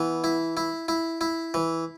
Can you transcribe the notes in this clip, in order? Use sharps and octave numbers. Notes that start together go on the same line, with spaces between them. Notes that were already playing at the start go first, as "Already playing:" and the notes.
Already playing: E3 B3
E4
E4
E4
E4
E3